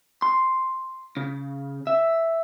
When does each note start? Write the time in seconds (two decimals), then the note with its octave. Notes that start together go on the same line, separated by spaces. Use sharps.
0.22 C6
1.17 C#3
1.87 E5